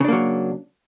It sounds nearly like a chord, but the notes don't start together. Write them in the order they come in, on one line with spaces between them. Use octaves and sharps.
C#3 D4 A#3 F#3